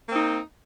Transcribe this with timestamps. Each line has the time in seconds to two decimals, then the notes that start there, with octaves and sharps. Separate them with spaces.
0.08 A#3
0.11 C4
0.14 D#4